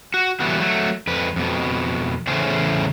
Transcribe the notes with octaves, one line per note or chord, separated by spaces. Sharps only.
F#4
E3 F#3 G3 A3 B3 F#4
F#3 A3
F2 B4
F2 B2
E2 A2 C#3 A3 C#4 C5